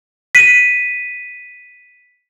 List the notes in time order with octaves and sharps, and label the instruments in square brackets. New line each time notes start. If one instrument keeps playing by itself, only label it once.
[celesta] B6 D#7